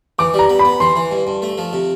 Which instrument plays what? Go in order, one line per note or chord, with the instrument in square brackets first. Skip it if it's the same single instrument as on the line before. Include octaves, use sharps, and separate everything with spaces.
[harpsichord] E3 [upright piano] D6
[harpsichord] G3
[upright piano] A#5
[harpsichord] B3
[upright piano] B5
[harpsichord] B3
[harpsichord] E3 [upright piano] C6
[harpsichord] E3
G2
G2
A3
F3
C3